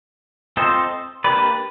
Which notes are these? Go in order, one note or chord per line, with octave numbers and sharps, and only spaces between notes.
C4 F4 A4 C5 D#5
A#3 D4 G4 B4 D5